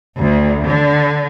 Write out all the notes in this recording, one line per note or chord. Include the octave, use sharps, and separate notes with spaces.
D2
D3